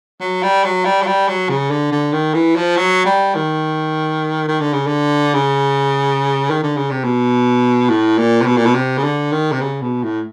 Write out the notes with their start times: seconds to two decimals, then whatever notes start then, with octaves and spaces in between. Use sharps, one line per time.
0.20 F#3
0.43 G3
0.64 F#3
0.85 G3
1.02 F#3
1.07 G3
1.28 F#3
1.49 C#3
1.70 D3
1.92 D3
2.12 D#3
2.34 E3
2.56 F3
2.77 F#3
3.05 G3
3.35 D#3
4.48 D#3
4.60 D3
4.73 C#3
4.87 D3
5.34 C#3
6.50 D#3
6.63 D3
6.76 C#3
6.91 C3
7.04 B2
7.89 A2
8.18 A#2
8.41 C3
8.46 B2
8.56 A#2
8.66 B2
8.74 C3
8.97 C#3
9.03 D3
9.32 D#3
9.51 C3
9.61 C#3
9.82 B2
10.03 A2